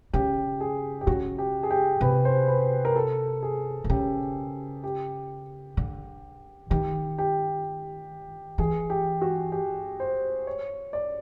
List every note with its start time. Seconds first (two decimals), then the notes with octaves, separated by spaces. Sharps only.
0.13 C#3 G4
0.60 G#4
1.01 G4
1.07 C#3 F#4
1.38 G4
1.63 G#4
1.71 G4
2.01 C3 B4
2.25 C5
2.48 B4
2.85 A#4
2.96 A4
3.43 G#4
3.84 C3
3.90 C#3 G4
4.84 G4
5.77 D3
6.70 D#3 G4
7.18 G4
8.58 E3 G#4
8.90 G4
9.22 F#4
9.52 G4
10.00 C5
10.47 C#5
10.93 D5